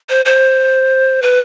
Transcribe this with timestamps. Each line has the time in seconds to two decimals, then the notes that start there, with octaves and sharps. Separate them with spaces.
0.09 C5
0.25 C5
1.22 B4